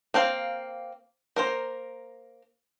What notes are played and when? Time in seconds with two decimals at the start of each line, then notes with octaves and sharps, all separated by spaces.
0.14 A#3 C4 F5
1.36 A#3 A#4 C5